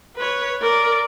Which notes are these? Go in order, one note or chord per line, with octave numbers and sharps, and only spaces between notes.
B4 C#5
A#4 D5